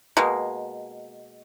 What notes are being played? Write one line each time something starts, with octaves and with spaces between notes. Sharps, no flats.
B2 G#3 A#3